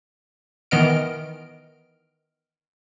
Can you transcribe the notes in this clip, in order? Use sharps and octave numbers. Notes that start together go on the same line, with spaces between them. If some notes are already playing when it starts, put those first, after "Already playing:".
D#3 E3 B3 D#5 F6 D7